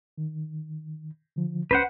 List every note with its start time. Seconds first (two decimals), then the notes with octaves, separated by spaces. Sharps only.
0.18 D#3
1.36 D3 F3
1.71 C#2 C#4 B4 C5 F#5 G6